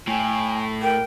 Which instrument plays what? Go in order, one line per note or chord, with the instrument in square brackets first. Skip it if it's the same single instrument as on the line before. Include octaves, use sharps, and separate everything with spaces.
[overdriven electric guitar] A2 [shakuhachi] G5 [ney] G#5
[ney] A#4 [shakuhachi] G5